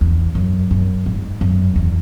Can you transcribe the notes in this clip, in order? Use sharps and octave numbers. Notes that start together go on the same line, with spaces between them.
E2
F#2
F#2
G#2
F#2
E2